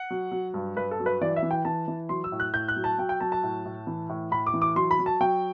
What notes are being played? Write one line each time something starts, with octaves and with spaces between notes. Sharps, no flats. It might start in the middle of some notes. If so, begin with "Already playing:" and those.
Already playing: F#5
F#3
F#3
G2
G2 B4
A4
F#3
B4
E3 D5
E5
E3
G5
E3 A5
E3
F#3 C6
E6
A2
F#6
A2 G6
F#6
F#3
A5
F#3 G5
G5
F#3 A5
A5
A2
A2
E3
A2
A2 B5
D6
E3
D6
F#3 C6
B5
F#3
A5
F#3 G5